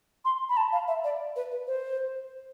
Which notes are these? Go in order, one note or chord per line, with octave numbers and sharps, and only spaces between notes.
C6
B5
A5
F5
E5
D5
B4
B4
C5